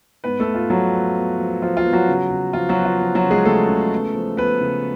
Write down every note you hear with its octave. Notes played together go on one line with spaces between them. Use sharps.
G#2 B3 B4
A3 A4
G#2
F4
F3 F#3 F#4
B3
B3
F3
F3 F4
F4
B3
F#3 F#4
C#3
C#3
F3 F4
F#3 F#4
B3
F4
F3
F#3 F#4
C#3
G#3 G#4
C#3 A3 A4
C#3
B3
F3
F3 B3 B4
C#3